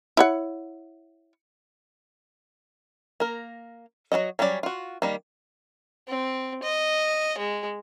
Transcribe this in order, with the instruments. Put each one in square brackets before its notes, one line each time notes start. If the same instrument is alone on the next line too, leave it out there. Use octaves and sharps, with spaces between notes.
[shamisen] E4 C#5 F#5
[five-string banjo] A#3 A#4
F#3 C4 F#4 D#5
F#3 G3 C#4 F#4 D5
F4 F#4
D#3 G3 A#3
[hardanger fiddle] C4
D#5
G#3